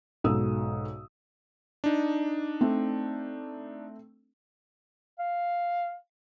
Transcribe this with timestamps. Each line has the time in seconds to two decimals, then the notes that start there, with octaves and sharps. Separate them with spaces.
0.24 B1 G#2 F#4 A4 D#6 E6
1.84 D4 D#4
2.61 A3 C4
5.19 F5